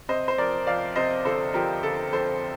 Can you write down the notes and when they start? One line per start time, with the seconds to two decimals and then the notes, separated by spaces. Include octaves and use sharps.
0.09 C3 C5 D#5
0.28 C5
0.38 F2 A#4 D5
0.67 F2 D5 F5
0.96 C3 C5 D#5
1.25 G1 A4 C5
1.54 F3 G4 A#4
1.83 G1 A4
2.12 F2 A4 C5